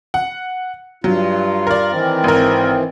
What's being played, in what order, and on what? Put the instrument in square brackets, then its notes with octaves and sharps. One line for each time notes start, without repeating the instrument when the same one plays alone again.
[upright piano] F#5
[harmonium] G2 F4 [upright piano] F#3
[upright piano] A#4 D5
[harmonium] D#3 E3 C4
[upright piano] G#1 A#4